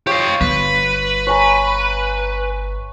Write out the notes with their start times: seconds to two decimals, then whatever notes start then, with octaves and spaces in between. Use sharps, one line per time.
0.07 F4 G4 C#5 F5
0.41 G1 B4
1.27 C#5 G#5 A#5